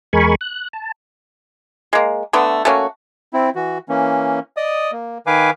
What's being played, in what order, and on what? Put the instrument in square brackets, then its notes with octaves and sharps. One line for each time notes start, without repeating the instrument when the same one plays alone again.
[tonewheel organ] E2 G#3 A#4 G#5 B5 C#6
F#6
A5
[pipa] G#3 A#3
D3 A3 B3
A3 A#3 C#4 F#4
[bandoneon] C4 E4
E3 F#4
E3 A#3 C#4
D5 D#5 D#6
A#3
D#3 B4 F5 G#5 D6